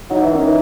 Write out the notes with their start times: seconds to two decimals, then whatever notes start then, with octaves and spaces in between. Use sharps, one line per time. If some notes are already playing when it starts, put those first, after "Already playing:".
0.10 F#3 D#4
0.21 E3
0.33 D#3 C#4
0.42 E3 D#4